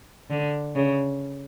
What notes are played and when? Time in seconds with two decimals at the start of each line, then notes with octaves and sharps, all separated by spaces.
0.30 D3
0.76 C#3